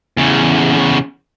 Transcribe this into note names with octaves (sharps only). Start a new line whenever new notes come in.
E2 C#3